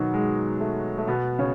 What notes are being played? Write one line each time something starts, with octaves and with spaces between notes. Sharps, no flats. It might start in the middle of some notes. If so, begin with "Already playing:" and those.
Already playing: B2 D#3 F#3 B3 D#4 F#4
G#3
A3
A3
B2 B3
C#3 C#4